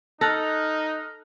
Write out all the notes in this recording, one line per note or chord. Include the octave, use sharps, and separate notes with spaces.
D#4 A4 F6 F#6 A#6